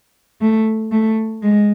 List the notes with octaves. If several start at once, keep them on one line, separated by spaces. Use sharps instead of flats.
A3
A3
G#3